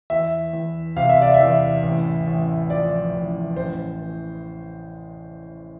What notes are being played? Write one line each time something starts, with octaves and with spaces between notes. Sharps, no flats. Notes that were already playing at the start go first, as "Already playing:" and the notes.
E2 E5
E2
C3 F5
E5
D5
E5
E2
A1
A1
F3 D5
A1
A1 C5
E3